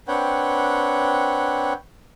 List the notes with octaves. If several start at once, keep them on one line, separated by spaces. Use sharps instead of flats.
C4 D4 B4 C#5 F#5 G5